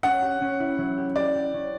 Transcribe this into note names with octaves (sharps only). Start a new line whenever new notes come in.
C#4 F#5
G4
C#4
E4
F#3
G4
G4 D5
G4
C#4